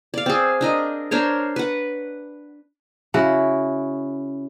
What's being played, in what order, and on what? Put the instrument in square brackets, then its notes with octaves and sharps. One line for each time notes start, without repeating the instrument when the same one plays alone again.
[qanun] D5 F5
C4 G#4
D4 A#4 D#5
D4 A#4 C5 C#5
B4 F#5
[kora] C#3 E4 F#4 F#5